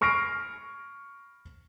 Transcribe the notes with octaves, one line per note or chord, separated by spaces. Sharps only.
B5 C#6 F6 A#6 C7 D7